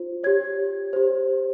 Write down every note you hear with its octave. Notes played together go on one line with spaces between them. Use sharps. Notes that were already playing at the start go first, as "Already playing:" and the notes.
Already playing: F4 C5
G4 C#5 G#6
G4 C5